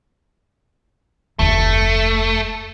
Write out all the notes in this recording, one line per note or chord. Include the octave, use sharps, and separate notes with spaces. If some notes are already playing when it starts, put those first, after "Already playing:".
F1 D2 A3